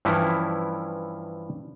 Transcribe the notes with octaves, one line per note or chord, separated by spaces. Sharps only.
G2 E3 F3 C#4 E4